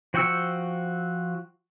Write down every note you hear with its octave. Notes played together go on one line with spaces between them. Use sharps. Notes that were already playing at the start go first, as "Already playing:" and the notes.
F3 F#4 G5 C#6 E6